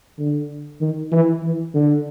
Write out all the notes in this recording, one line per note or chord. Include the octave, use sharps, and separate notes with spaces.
D3
D#3
E3
E3
D3